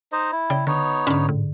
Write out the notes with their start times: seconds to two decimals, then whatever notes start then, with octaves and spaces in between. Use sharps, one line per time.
0.12 D#4 C5 D#5
0.32 E4
0.50 C#3 D5 G5
0.67 D3 B3 D#4 C#5
1.07 G#2 D3 C#4 D4
1.29 A2